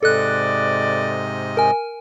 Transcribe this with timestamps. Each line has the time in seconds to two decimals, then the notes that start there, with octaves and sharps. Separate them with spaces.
0.03 G#2 C3 A4 D5 D#5 F#6
1.57 A#4 G#5